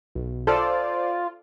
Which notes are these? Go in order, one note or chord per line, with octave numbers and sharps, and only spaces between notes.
B1
F4 A4 C5 D5